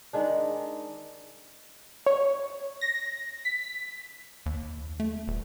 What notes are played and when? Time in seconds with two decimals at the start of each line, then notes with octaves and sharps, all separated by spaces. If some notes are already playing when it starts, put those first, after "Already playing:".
0.13 D#3 G#3 D4
2.06 C#5
2.81 A#6
3.45 B6
4.46 D#2
5.00 A3
5.28 D#1